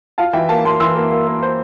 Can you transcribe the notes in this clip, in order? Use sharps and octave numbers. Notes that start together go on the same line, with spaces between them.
F4 F5 A5
E3 E5 G5
A#3 F5 A5
A#3 A5 C6
E3 C6 E6
A#3
A#3
A#3
C5